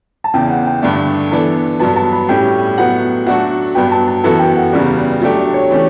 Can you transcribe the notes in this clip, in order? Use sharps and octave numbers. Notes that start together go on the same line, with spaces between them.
A5
E2 C#3 E3 G5
F#5
G5
G2 D3 A3 D4
E3 B3 D4 A4 A5
G2 F#3 B3 A5
A5
B5
A2 G3 C#4 G4 G5
A2 F#3 B3 F#5
F#3 A3 D4 F#4 A4 F#5
G2 F#3 B3 G5
A5
A5
F#2 E3 B3 F#4 A4 A5
G5
F#5
E2 C#3 G3 B3 F#4 D5
F#3 A3 D4 G4
D5
C#5
E3 A3 C#4 G4